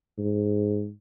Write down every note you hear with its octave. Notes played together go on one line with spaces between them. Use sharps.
G#2